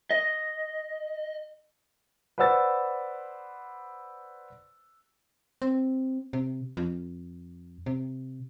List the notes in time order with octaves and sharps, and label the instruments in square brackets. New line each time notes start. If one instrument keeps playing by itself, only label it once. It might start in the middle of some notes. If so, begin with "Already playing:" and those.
[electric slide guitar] D#5
[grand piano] B4 C5 D5 F#5 E6 A6
[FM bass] C4
C3
F2
C3